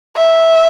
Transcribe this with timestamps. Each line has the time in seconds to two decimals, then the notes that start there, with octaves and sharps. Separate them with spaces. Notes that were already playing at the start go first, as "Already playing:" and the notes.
0.16 E5